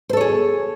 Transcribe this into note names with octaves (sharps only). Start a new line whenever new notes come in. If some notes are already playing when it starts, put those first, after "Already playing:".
G#4 A4 C5 C#5